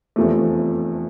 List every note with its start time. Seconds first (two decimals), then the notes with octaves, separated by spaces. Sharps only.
0.16 F1 E2 C3 F3 A3